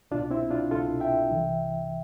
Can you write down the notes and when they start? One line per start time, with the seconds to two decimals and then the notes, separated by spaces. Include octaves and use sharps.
0.11 C2 D4 F4
0.14 B2
0.31 C4 E4
0.50 D4 F4
0.71 C2 B2 F4 A4
1.00 E5 G5
1.31 C2 C3 E3